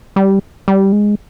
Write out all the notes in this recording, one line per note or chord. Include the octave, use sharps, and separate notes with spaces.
G3
G3
G#3